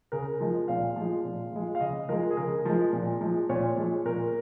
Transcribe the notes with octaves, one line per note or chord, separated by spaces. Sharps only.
C#3 A#4
F3 G#3
A#2 F5
F3 G#3
A#2
F3 G#3
F5
C#3 D#5
F3 G#3 A#4
G#4
C#3 A#4
F3 G#3
A#2
F3 G#3
A#2 C#5
F3 G#3
A#2 A#4